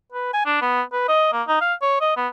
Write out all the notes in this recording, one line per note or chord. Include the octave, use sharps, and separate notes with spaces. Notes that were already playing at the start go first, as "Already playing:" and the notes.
B4
G#5
D4
B3
B4
D#5
A#3
D#4
F5
C#5
D#5
B3